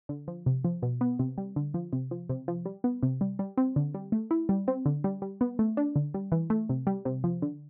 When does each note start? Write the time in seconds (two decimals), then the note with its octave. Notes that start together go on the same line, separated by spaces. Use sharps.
0.09 D3
0.28 F3
0.46 C3
0.65 F3
0.82 B2
1.01 B3
1.19 C3
1.38 G3
1.56 D3
1.74 F3
1.93 C3
2.11 F3
2.29 C3
2.48 F3
2.65 G3
2.84 B3
3.03 C3
3.21 G3
3.39 G3
3.57 C4
3.76 D3
3.94 G3
4.12 A3
4.31 E4
4.49 G3
4.68 C4
4.86 D3
5.04 G3
5.22 G3
5.41 B3
5.59 A3
5.77 D4
5.96 D3
6.14 G3
6.32 E3
6.50 A3
6.69 C3
6.87 G3
7.05 C3
7.24 F3
7.42 D3